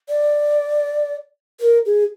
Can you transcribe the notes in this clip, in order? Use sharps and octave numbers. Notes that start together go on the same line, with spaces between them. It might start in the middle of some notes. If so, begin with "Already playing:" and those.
D5
A#4
G#4